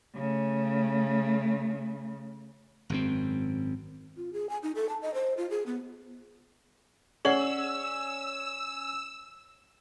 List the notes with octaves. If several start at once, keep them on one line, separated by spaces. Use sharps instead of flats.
C#3 A3
G#1 F#2 C4
F4
G#4
G#5
D#4
A4
A5
D#5
C5
F4
G#4
B3
C#4 G#4 D5 F#5 E6 F#7